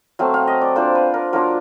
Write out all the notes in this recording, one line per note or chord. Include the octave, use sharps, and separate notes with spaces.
F#3 A3 C4 F5
F5
D#5
D5
A#3 D4 F4 C5
B4
A#4
F#3 A#3 D4 F4 A#4